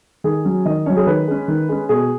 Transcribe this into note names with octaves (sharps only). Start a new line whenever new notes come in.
D#3 G#4
F#3 C#4
D#3 D#5
F#3 C#4 C#5
G#4
D#3 B4
G#3 C#4
D#3
G#3 C#4
B2 G#4